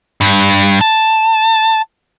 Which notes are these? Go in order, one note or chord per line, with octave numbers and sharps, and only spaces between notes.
G2
A5